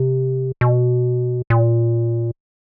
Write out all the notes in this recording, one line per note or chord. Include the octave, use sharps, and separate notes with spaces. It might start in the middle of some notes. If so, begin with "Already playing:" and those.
Already playing: C3
B2
A#2